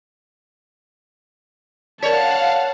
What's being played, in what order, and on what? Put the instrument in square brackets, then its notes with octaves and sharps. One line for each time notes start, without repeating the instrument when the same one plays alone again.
[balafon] A#4 D5 [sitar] C#5 [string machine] F5 F#5 [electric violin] A5